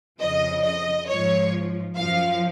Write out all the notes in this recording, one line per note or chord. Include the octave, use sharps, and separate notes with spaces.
F2 C#3 F3 D#5
D#5
G#2 F3 C#5
F#2 F3 F5